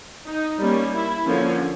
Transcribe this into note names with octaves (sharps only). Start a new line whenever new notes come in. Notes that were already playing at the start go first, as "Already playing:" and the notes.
D#4
G3 A#3 C#4
E4
D3 F3 A#3 C#4